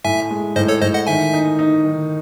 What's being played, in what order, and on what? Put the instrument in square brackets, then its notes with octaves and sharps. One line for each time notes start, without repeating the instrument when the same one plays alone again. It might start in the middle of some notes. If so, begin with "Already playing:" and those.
[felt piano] A2 [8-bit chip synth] E5 G#5
[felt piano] G#3
[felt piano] A2 [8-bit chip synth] C5 D#5
[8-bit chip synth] A4 C#5
[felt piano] A2 [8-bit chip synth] C5 D#5
[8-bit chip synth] D#5 F#5
[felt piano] D#3 [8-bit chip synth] E5 G#5
[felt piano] D#4
D#4
D#3